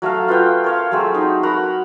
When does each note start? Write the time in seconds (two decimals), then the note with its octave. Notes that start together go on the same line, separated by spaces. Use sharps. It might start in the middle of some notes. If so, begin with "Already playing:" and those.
0.02 F#3 A3 A4 F5
0.28 F4 B4 D#5 G5
0.64 A#4 C#5 F5
0.92 F#3 G#3 A3 C4
1.14 D#4 C5
1.43 F#4 A#4 A#5 B5